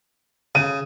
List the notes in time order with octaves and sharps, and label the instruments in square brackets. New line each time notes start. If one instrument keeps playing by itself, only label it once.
[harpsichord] C#3 [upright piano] D#7